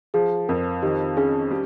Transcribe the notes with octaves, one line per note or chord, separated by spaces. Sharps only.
F3 G#4
F2 A#4
D#3 G4
C#4 G#4
G3